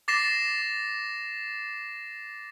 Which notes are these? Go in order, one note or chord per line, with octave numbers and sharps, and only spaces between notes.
D6 A6 A#6 C7 E7